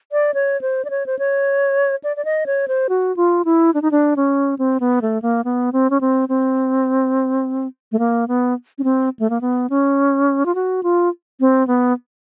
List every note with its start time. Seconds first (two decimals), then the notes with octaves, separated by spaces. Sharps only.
0.12 D5
0.34 C#5
0.61 C5
0.85 D5
0.90 C#5
1.06 C5
1.19 C#5
2.04 D5
2.17 D5
2.25 D#5
2.46 C#5
2.68 C5
2.89 F#4
3.17 F4
3.45 E4
3.74 D4
3.82 D#4
3.91 D4
4.16 C#4
4.59 C4
4.80 B3
5.02 A3
5.22 A#3
5.44 B3
5.73 C4
5.90 C#4
6.01 C4
6.29 C4
7.92 A3
7.99 A#3
8.28 B3
8.78 C#4
8.84 C4
9.19 A3
9.30 A#3
9.41 B3
9.70 C#4
10.46 F4
10.55 F#4
10.83 F4
11.40 C4
11.67 B3